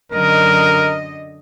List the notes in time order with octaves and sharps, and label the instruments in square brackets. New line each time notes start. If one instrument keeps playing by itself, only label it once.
[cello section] F#2 D3 D#5 [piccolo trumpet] A#4